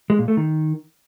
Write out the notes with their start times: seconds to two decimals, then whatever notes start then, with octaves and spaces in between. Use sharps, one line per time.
0.10 G#3
0.19 A#2
0.28 A3
0.37 D#3